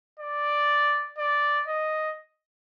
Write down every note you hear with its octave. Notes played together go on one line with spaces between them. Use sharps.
D5
D5
D#5